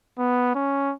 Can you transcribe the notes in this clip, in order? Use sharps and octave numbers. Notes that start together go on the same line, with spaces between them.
B3
C#4